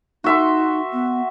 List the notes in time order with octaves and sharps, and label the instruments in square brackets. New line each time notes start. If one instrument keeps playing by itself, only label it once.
[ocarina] D#4 [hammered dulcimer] F#4 E5 C6
[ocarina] B3